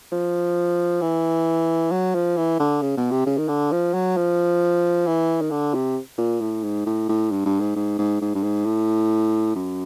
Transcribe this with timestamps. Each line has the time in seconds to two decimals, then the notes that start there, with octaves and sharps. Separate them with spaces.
0.12 F3
1.02 E3
1.91 F#3
2.15 F3
2.37 E3
2.60 D3
2.82 C#3
2.97 B2
3.11 C3
3.26 C#3
3.38 D#3
3.49 D3
3.72 F3
3.94 F#3
4.17 F3
5.07 E3
5.42 D#3
5.51 D3
5.74 C3
6.18 A#2
6.41 A2
6.63 G#2
6.86 A2
7.09 A2
7.31 G2
7.46 G2
7.61 G#2
7.76 G#2
7.99 G#2
8.22 G#2
8.35 G2
8.43 G#2
8.66 A2
9.55 F#2